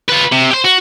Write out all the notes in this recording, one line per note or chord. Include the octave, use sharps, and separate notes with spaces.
F4 B4
C3
G4 C5
F#4